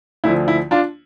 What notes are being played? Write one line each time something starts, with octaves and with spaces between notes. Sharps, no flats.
D2 D3 F3 E4
E4
D4 F4